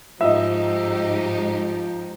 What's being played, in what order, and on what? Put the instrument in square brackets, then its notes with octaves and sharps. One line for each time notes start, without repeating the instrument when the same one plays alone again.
[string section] G#2 D#4 G4 [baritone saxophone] F3 [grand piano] D#5 E5